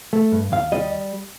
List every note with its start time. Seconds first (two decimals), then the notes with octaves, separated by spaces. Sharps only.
0.13 A3
0.32 G2
0.52 D#2 F5
0.72 G3 D#5